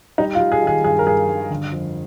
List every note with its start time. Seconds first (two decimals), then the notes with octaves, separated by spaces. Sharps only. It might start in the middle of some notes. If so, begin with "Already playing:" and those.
0.18 G3 D#4
0.35 F4
0.40 G3
0.52 G#4
0.62 D#3 G#4
0.84 G2 G#4
0.99 A#4
1.07 G2 G#4
1.28 G2
1.50 D3
1.72 F2